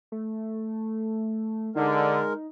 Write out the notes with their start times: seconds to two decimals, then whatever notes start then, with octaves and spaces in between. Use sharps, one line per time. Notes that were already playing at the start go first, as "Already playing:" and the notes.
0.12 A3
1.76 D3 G#3 D#4 A#4